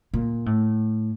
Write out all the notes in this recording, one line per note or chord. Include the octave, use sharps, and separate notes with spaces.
A#2
A2